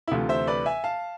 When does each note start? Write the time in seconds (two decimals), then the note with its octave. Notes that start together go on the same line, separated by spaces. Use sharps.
0.08 E4
0.11 D2 C3 E3 A3 F4
0.29 C5 E5
0.47 B4 D5
0.66 E5 G#5
0.84 F5 A5